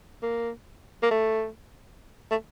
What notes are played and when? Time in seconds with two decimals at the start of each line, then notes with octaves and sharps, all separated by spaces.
0.23 A#3
1.03 A#3
1.11 A3
2.31 A3